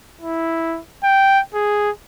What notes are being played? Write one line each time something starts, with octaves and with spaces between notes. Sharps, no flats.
E4
G5
G#4